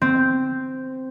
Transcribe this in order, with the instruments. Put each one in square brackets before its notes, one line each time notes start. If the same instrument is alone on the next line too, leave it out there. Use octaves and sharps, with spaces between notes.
[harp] C4